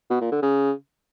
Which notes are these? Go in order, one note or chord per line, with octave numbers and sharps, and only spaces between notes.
B2
A#2
D3
C#3